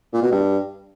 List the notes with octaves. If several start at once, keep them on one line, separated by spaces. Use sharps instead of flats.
A#2
B2
G2